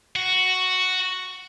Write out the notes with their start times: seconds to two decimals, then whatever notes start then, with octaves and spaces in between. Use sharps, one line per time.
0.16 F#4